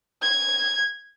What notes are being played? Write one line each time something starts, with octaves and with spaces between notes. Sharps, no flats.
G#6